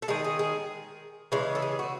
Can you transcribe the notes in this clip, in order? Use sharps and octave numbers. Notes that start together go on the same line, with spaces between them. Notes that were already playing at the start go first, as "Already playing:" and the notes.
A4
D#3 G#3 G#4
G#4
G#4
C#3 E3 G#3
A4
G#4
F#4